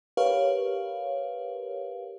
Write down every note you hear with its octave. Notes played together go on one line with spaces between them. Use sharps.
G4 A#4 B4 C#5 F5